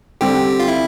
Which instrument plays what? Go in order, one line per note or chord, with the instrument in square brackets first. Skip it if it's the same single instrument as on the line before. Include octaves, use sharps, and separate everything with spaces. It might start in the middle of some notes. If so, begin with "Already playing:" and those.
[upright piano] D3 G3 C4 [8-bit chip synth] G4
[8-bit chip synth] F4
E4